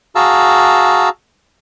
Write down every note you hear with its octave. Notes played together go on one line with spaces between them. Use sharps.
F#4 G#4 F5 A5 A#5 E6